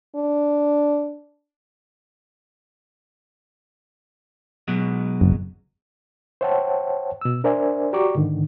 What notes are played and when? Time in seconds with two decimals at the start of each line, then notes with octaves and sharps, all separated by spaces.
0.16 D4
4.68 B2 F#3 G#3
5.21 F#1
6.41 C5 C#5 E5 F#5 G5 A5
7.21 B2 E6
7.44 D4 A#4 C5 D5 E5 G#5
7.93 F#4 G4 D5 A#5 C#6 D6
8.15 G#2 D3 D#3